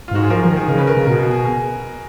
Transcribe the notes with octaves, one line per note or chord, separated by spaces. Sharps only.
F4
G#2 F#4
G#4
F3 A#4
F3 A#4
D#3
G#4
C#3 A#4
B4
A#4
C#3
B2 A#4
G#4
F#4
G#4